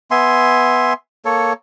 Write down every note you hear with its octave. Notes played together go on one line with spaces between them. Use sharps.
B3 E5 G#5 C6
A#3 A4 C#5